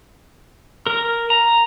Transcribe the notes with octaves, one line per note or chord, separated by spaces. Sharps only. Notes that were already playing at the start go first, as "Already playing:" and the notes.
A#4
A#5